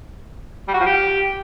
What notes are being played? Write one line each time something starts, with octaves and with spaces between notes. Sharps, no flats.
G3
F#4
F3
G4